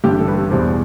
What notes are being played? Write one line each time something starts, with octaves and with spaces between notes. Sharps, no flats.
A1 G2 D3 G4
A4
B4
A4
E2 B2 G3 C5